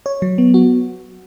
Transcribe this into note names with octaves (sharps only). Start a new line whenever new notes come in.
C#5
F#3
B3
F#4